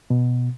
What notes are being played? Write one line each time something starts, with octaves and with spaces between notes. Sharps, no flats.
B2